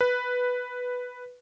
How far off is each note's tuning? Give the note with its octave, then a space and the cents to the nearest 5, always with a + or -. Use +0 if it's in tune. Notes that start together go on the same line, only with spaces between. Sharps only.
B4 +0